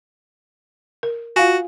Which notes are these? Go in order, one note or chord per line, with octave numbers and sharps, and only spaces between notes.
A#4
F4 F#4 F5 G#5